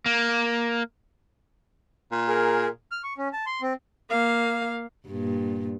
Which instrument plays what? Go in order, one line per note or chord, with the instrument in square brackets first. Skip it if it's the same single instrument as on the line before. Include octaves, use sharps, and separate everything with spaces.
[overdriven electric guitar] A#3
[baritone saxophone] A#2
[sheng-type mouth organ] G#4 A#4
F6
C#6
C#4
A5
C6
C4
[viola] A#3 F5
[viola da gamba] G2 A#2